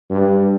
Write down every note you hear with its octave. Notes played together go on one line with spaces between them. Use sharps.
G2